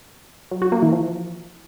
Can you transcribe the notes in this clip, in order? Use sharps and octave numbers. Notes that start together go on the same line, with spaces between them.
F#3
F#4
A#3
E3
F3